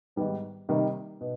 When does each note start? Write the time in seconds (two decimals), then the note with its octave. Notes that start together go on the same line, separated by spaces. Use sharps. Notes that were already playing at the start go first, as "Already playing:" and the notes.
0.16 G#2 D#3 G3 B3
0.69 C3 D#3 G3 A#3 D#4
1.21 B2